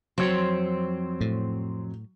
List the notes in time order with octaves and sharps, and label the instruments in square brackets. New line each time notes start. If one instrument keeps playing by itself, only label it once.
[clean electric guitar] F2 C#5 [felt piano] F#3 [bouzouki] C4
[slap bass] A2